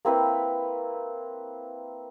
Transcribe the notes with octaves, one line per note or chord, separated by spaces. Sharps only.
A#3 C4 E4 B4